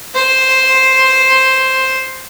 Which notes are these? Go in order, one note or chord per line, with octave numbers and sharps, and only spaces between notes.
C5